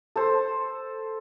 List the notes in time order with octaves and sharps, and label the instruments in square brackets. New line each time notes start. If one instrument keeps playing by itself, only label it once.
[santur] A4 C5